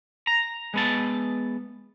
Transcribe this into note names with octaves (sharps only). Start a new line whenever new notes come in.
A#5
G#3 B3 A5